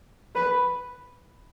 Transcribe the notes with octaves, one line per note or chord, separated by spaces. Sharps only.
B4